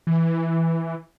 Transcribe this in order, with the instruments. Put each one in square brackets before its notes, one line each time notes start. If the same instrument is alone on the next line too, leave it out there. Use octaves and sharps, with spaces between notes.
[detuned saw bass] E3